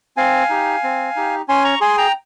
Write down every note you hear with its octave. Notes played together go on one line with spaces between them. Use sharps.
C4 F5 G#5
D#4 G4
C4
D#4 G4
C#4 G#5 C6
A#5 C#6
G#4 G#5 C6
G5 A#5